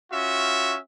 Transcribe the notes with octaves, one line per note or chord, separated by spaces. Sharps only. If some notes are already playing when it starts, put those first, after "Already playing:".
C#4 F4 F#4 E5